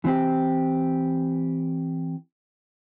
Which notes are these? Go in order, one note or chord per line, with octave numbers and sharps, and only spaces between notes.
E3 C4 G4